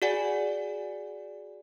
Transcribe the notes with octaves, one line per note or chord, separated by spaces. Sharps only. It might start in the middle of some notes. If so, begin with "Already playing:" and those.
F#4 G#4 D5 F#5 G#5